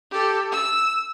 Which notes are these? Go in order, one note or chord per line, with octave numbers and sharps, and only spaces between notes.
G4 A4
E6